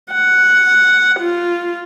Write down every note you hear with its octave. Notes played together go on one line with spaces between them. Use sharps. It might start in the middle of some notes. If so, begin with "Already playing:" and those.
F#5
F4